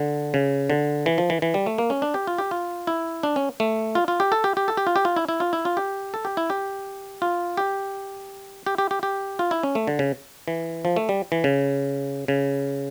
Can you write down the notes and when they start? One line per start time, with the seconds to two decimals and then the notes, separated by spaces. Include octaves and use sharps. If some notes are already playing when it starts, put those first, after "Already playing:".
Already playing: D3
0.34 C#3
0.70 D3
1.06 E3
1.18 F3
1.30 E3
1.42 E3
1.54 G3
1.66 A3
1.78 A#3
1.90 C#4
2.02 D4
2.14 G4
2.27 F4
2.38 G4
2.51 F4
2.87 E4
3.23 D4
3.36 C#4
3.60 A3
3.95 F4
4.08 F4
4.20 G4
4.32 A4
4.44 G4
4.57 G4
4.68 A4
4.77 G4
4.87 F4
4.96 G4
5.05 F4
5.16 E4
5.29 E4
5.40 F4
5.53 E4
5.65 F4
5.77 G4
6.14 A4
6.25 G4
6.37 E4
6.50 G4
7.22 F4
7.57 G4
8.66 G4
8.78 G4
8.91 G4
9.03 G4
9.39 F4
9.51 E4
9.63 C#4
9.75 A3
9.87 D3
9.99 C#3
10.48 E3
10.85 F3
10.96 A3
11.09 G3
11.32 E3
11.44 C#3
12.28 C#3